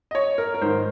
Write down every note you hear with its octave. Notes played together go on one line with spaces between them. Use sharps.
D#5
C#5
A#4
A#4
G#2 D#3 C5